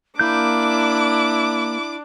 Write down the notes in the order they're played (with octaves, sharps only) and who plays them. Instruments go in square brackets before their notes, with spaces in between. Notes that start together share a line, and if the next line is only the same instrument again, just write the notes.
[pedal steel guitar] A#3 G6 [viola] D4 [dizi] E4 [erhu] D6